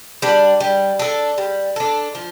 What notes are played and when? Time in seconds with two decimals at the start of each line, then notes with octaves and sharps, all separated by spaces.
0.22 G3 D4
0.60 G3
0.99 D4 A4
1.38 G3
1.76 D4 A4
2.15 F3